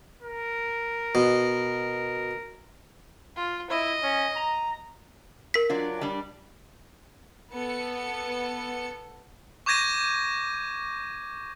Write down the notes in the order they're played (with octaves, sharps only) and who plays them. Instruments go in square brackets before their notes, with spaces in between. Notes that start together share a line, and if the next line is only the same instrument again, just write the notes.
[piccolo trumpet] A#4
[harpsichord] B2
[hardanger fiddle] F4
[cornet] E4 [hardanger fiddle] D#5
[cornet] C#4
A#5
[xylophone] A#4 B6
[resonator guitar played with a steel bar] F#3 D4 F4
G3 D4
[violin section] B3 A4 C#7
[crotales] C#6 D6 G6 G#6 A#6 D#7